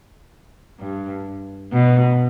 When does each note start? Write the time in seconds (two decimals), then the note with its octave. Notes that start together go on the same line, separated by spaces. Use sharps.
0.80 G2
1.73 B2